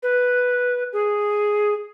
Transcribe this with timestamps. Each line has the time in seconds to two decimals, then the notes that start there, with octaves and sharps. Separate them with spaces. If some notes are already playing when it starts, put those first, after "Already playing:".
0.03 B4
0.93 G#4